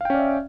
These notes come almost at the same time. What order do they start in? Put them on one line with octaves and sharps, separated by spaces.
F5 G5 C#4 D5 E5